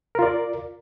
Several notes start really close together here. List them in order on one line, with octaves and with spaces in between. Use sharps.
A#4 F4 D5